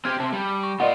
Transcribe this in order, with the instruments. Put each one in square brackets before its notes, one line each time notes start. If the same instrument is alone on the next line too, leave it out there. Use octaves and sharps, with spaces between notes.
[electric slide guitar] C4 G4 [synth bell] F6 G#6
[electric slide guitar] C3 C4 [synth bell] A5
[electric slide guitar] G3
[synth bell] C#6
[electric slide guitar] A#2 F4 [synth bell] D5 D#5 F#5